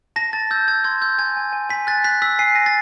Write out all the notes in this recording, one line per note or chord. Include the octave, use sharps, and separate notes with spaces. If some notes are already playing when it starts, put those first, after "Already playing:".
A5 A#6
A5 A6
E6 G6
E6 G#6
C6 G#6
E6 G6
G#5 G#6
G#5
G#5
G#5 B6
F#6 A6
F#6 B6
E6 B6
G#5 C7
G#5 A#6
A6